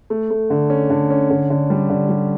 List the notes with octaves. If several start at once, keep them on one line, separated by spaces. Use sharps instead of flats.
A3
A3
D3
C#4
D3
C#4
D3
D3
G3
D3
G3